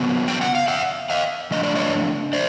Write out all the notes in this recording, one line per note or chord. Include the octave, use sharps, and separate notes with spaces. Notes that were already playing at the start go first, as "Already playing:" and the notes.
Already playing: C#3 F#3 B3
G5
F#5
F5
E5 F#5
D#5 F5
C#3 F3 A3 D4 D#5
D5
C#5 D#5
C5 D5